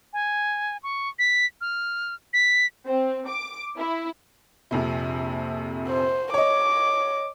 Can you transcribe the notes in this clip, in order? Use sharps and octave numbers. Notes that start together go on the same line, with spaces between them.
G#5
C#6
B6
F6
B6
C4
D6
E4
A#1 F2 C3
C5
C#5 D#5 D6